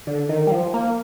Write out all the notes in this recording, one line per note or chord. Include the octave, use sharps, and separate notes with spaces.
D3
D#3
G3
F3
A#3